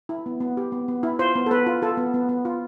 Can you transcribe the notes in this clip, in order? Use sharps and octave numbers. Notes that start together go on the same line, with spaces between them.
E4
B3
B3
G4
B3
B3
E4
F4 C5
B3
A4
B3 B4
F4
F4 A4
B3
B3
B3
F4